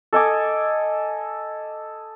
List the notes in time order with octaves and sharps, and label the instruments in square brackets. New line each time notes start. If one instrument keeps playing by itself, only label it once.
[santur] A4 D#5 G#5 D6